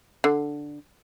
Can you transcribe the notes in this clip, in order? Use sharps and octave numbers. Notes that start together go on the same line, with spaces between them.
D3